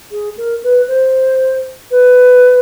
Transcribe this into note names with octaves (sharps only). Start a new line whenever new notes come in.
G#4
A#4
B4
C5
B4